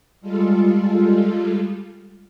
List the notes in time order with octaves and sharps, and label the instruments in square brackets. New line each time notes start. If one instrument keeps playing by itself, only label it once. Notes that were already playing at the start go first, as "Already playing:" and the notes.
[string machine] G3 G#3 F4 A4